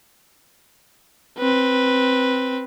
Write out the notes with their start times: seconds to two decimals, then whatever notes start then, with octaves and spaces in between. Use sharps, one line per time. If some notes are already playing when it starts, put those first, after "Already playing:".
1.39 C4 B4